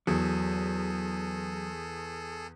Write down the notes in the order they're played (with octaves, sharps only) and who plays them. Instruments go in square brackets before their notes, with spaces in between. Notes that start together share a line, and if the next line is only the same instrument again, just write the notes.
[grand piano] E2 [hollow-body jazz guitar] F#3 [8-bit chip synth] G#4 A4